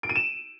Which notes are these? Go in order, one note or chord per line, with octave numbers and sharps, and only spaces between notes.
D7
D#7
E7